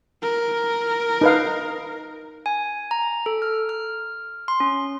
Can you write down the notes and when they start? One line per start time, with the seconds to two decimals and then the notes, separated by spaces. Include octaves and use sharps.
0.22 A#4
1.21 D#4 B4 F5
2.46 G#5
2.91 A#5
3.26 A4
3.42 F6
3.69 F6
4.48 C6
4.60 C#4